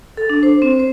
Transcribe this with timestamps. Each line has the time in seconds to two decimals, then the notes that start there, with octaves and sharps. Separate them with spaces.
0.17 A4
0.29 D4
0.43 C5
0.62 C4
0.79 C5